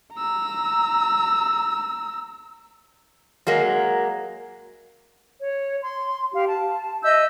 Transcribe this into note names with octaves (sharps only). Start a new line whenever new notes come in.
A#5 E6
F#3 G#3 A#3
C#5
C6
G4 F5
A5
D#5 E5 E6 G6